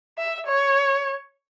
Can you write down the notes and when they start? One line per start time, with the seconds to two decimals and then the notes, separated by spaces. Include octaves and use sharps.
0.18 E5
0.47 C#5